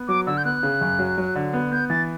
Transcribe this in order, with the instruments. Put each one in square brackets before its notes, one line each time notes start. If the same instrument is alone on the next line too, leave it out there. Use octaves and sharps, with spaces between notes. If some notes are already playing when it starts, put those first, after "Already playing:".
Already playing: [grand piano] B3
[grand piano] F#3 [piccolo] D6
[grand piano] D3 [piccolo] E6
[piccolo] G6
[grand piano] B3 [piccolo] F#6
[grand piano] C#3
F#2
F#3
F#3
D3
B3
[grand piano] B3 [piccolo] G6
[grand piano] E3 [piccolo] A6